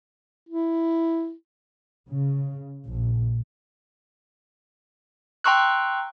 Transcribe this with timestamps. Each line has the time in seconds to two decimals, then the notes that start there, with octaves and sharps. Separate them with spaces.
0.49 E4
2.08 C#3
2.86 A#1
5.44 G5 A#5 C6 C#6 E6 F#6